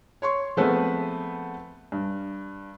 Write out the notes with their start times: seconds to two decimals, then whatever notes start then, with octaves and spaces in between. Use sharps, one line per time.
0.22 C#5 C6 C#6
0.57 F3 G#3 A3 B3 C4 B4
1.92 G2